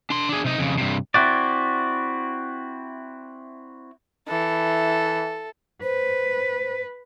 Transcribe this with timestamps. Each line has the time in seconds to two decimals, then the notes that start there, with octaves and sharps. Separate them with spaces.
0.10 D4 C6
0.29 D4 G#4
0.44 C3 D#4
0.58 F2 C#3
0.78 G2 C3
1.14 C4 E4 F#4 D5
4.28 E3 A4
5.83 B4 C5